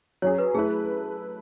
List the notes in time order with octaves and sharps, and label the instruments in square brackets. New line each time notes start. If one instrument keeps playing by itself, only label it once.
[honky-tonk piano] F#3 C#4 G#4 [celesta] C#5
[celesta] B4
[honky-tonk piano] A3 E4 B4 [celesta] G#4